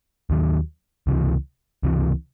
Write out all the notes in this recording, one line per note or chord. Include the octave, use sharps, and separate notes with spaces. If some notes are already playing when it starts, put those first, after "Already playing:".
D#2 D#3 F#3
C#2 C3 E3
C#2 C3 E3